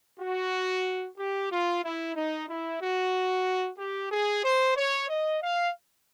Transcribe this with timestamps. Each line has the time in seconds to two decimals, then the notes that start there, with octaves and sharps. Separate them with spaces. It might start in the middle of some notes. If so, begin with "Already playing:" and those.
0.20 F#4
1.18 G4
1.51 F4
1.83 E4
2.16 D#4
2.49 E4
2.82 F#4
3.79 G4
4.12 G#4
4.44 C5
4.77 C#5
5.09 D#5
5.42 F5